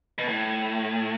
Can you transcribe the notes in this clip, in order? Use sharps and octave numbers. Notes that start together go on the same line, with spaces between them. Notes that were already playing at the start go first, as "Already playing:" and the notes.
B2
A2